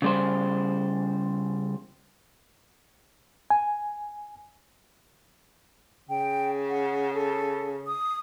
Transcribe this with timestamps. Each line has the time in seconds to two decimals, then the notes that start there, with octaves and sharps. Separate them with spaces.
0.02 C#3 G3 C5
3.50 G#5
6.09 C#3 G5
6.69 F#5
7.13 A4
7.87 D#6